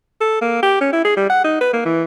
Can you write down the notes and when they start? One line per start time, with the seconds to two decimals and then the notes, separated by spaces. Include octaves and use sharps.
0.21 A4
0.41 A#3
0.63 G4
0.81 C#4
0.93 E4
1.05 G#4
1.17 G3
1.30 F#5
1.44 D#4
1.61 B4
1.73 A#3
1.85 E3